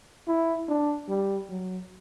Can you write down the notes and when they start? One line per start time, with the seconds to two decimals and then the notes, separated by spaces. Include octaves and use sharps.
0.27 E4
0.68 D4
1.09 G3
1.49 F#3